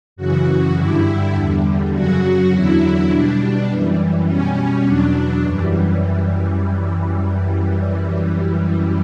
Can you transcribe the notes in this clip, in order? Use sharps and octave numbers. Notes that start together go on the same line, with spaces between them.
F#2 C#3 E3 F#4
G2 D3 G3 E4
E2 D3 G3
F#2 C#3 F#3 F#4
E2 D3 F#3 E4
B2 G3 D4
F#2 E3 G3
B2 G3 C#4
E2 B2 F#3 D4
F#2 E3 G3